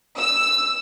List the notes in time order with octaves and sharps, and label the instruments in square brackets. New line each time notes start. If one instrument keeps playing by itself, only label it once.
[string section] E6